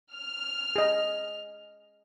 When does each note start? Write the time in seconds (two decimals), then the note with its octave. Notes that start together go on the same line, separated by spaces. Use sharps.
0.14 F6
0.76 G#4 D#5